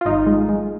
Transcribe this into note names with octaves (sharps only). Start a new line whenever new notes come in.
F4
G#1 D#4
G#3
G#3